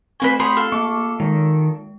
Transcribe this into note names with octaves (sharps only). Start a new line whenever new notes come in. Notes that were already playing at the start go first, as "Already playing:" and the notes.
A3 C4 B4 C5 G#5 C#6
G4 C#5 B5 C6 D#6
F4 A4
A#3 C#6 D6
D#3 G#3